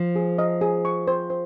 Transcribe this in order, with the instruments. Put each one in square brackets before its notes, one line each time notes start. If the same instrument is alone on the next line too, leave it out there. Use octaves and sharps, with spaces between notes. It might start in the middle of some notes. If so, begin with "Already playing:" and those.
Already playing: [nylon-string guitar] F3
[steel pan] G#4
D#5
G#4
C#6
C5
C5